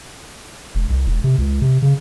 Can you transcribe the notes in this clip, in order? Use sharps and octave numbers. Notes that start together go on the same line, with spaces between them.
E1
C2
E1
C3
C#2
C3
C#3